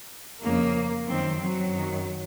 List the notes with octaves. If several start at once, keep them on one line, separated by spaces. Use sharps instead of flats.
F2 C#3 A#3
F#2 D#3 C4
F#3
F#2 D#3